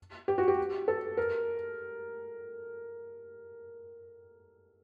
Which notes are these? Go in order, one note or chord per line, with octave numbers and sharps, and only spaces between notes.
G4
F#4
G4
A4
A#4